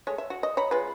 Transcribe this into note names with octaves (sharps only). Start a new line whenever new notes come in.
G#3 A3 C#5
E5
F#4
D#5
C#5 A#5 B5
G#3 F4 B4